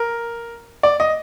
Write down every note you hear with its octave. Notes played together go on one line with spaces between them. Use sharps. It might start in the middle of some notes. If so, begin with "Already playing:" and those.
Already playing: A#4
D5
D#5